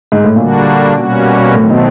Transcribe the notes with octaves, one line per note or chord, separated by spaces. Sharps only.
G#2
A2
A#2 D3 G3 A#3 D4 F#4
B2 G3 A#3 C#4 F#4
A2 D#3 F#3 A3 C4
B2